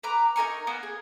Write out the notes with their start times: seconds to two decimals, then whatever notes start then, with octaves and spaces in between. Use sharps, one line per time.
0.03 B4 A#5 D6
0.36 D#4 A#4 G#5 C#6
0.67 A#3 B3 F#5 G#5
0.83 G#4